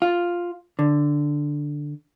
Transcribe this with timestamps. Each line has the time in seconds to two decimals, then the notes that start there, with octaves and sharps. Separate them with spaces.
0.02 F4
0.79 D3